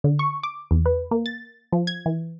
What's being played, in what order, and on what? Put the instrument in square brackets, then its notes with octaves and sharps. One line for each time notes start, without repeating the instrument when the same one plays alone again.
[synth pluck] D3
C#6
D6
E2
B4
A#3
A6
F3
G#6
E3